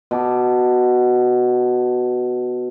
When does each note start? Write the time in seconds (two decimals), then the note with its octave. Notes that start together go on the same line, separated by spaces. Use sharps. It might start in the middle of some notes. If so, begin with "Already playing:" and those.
0.11 B2 A5 D6